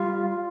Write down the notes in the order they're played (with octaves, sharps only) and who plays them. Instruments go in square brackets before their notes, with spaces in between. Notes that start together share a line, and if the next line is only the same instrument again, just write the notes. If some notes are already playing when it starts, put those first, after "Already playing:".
Already playing: [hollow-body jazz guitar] G3 [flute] F4
[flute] F4